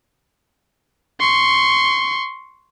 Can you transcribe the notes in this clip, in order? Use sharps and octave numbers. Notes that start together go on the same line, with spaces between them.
C6 C#6